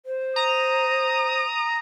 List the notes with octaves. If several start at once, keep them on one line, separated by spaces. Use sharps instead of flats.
C5
A#5 D#6